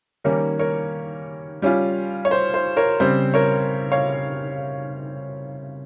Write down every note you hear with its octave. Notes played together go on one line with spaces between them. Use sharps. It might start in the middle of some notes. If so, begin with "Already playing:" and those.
D#3 G3 A#3 C#4 A#4 C#5
A#4 C#5
G3 C#4 F4
C#5
C5
C5
A#4 C#5
C#3 G3 C4 C5
A#4 C#5
C#5 F5